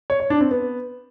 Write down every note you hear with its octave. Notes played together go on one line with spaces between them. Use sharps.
C#5
C#5
D4
C4
B3